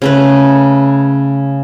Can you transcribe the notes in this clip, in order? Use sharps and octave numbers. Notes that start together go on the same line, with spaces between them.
C#3 A3 B4